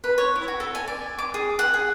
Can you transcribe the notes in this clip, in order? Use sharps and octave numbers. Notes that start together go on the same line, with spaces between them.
B4
C#5
E4
F#4
A4
G#5
D5
D6
G#4
F#5
G#4